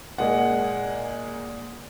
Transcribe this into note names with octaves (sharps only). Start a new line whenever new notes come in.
A#2 G#3 A#4 F#5